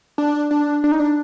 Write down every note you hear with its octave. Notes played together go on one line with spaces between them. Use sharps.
D4
D4
D4
D#4
D4